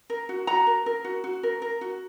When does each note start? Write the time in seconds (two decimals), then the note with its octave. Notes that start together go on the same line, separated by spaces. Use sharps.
0.10 A#4
0.29 F#4
0.47 F#4 A#5
0.67 A#4
0.86 A#4
1.04 F#4
1.24 F#4
1.43 A#4
1.62 A#4
1.81 F#4